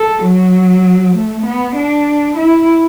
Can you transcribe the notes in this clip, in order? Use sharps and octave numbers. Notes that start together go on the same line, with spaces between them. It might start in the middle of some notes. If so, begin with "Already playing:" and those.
Already playing: A4
F#3
A3
B3
D4
E4